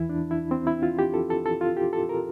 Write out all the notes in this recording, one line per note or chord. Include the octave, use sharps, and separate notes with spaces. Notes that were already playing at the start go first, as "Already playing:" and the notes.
Already playing: E2 E3 E4
D4
E4
C4
E4
F4
G4
A4
A4
A4
F4
G4
A4
A#4